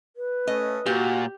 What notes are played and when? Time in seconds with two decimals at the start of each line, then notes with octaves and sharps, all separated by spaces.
0.16 B4
0.47 A3 C#4 D#5
0.86 A#2 F#4 G4